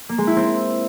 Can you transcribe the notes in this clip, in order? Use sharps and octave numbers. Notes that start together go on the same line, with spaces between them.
A#3
G#3
E4
C4